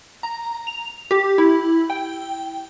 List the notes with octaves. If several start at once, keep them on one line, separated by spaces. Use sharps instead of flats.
A#5
F7
G4
E4
G5